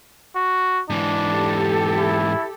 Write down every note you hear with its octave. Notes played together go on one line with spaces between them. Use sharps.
F#4
G#2 E3 D4
G4 A4
E4